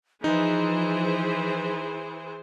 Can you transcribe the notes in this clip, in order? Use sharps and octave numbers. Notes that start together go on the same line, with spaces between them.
E3 F3 D#4 G#4 C5